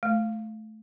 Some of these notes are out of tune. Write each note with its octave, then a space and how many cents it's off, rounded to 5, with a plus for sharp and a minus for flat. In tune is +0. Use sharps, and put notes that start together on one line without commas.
A3 -15